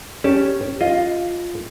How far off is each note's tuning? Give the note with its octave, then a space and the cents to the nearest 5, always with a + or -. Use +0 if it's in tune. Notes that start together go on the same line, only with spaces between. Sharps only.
C#4 +0 G4 +0 A5 +0
F4 +0 D#5 +5